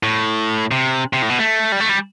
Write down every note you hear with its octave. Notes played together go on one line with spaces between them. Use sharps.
A2
C3
C3
A2
B2
A3
G3
A3
G3